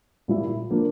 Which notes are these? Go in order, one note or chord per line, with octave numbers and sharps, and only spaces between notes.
A#2 G3 A#3 E4
F3 A#3 D4